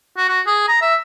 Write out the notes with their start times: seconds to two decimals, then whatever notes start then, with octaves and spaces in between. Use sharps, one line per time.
0.17 F#4
0.28 F#4
0.47 G#4
0.68 A#5
0.81 E5